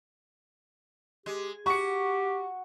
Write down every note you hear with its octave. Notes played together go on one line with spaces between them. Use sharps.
G#3 G4
F#4 G4 C#6 C#7